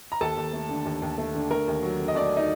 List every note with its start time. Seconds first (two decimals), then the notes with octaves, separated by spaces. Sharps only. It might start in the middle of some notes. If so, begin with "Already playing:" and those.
0.12 A#5
0.21 D#2 A4 A5
0.37 D#2
0.53 A3
0.69 D3
0.85 D#2
1.02 D#2
1.18 A3
1.35 D3
1.51 A3 A#4
1.68 D#2
1.83 F#3
2.00 D3
2.08 D#5
2.15 A3 D4 D5
2.37 D#4 D#5